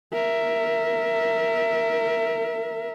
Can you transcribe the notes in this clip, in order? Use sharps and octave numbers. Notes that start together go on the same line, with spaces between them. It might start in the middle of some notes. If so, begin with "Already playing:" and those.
A#4 E5